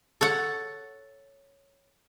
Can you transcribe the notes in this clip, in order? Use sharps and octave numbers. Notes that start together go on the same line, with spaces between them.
A4 C#5 F#5